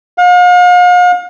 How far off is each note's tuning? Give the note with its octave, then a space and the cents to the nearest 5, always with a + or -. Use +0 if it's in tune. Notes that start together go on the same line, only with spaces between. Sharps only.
F5 +45